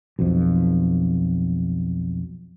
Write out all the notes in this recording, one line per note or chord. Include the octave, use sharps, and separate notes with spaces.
B1 F2